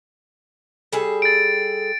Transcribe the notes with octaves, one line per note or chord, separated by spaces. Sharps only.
G3 G#4 A4
A6 D7